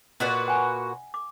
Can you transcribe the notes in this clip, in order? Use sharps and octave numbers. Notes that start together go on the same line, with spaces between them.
A#2 F#4 B4 D#5
F#5 G#5
D6